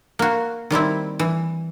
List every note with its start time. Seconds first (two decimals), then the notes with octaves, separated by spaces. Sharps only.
0.19 A#3 F#4
0.70 D#3 G3 C4 E4
1.19 E3